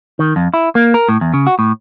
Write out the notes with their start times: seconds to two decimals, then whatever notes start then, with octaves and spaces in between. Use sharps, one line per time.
0.19 D#3
0.36 F2
0.54 E4
0.75 A#3
0.94 A#4
1.09 A2
1.21 E2
1.34 C#3
1.47 F#4
1.59 A2